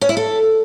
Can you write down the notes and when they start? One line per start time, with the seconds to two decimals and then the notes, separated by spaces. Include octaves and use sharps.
0.01 C#4
0.09 E4
0.17 A4